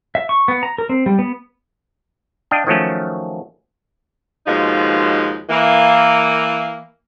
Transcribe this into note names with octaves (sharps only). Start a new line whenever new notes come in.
E5
C#6
B3
A#5
A#4
C4
G3
B3
D4 D#5 F5 G5
D#3 F3 F#3 A3 C#4
D#2 B2 F3 G#3 D#4
E3 A#3